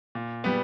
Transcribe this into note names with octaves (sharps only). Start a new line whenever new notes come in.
A#2
G3 B3